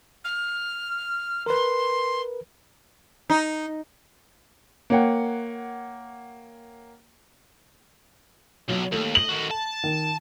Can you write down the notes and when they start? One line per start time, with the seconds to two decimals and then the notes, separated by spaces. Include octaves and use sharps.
0.24 F6
1.46 A#4 B4 C6
3.30 D#4
4.90 A#3 C#5 F#5 G5
8.69 B1 F#3
8.92 D#2 A3
9.15 D#5 F#7
9.29 D#3 F#4
9.51 A5
9.84 D#3